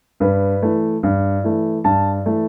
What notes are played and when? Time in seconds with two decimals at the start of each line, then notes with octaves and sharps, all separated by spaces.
0.20 G2 B4
0.62 E3 A3
1.03 G2
1.44 E3 A3
1.84 G2 A5
2.26 E3 A3